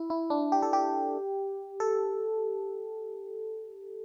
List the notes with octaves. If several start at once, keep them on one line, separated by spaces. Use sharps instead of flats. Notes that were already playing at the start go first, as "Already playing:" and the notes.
Already playing: E4
E4
D4
G4
A4
G4
A4